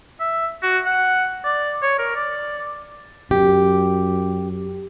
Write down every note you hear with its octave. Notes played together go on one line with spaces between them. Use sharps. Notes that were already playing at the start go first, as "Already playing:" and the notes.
E5
F#4
F#5
D5
C#5
A#4
D5
F#2 G4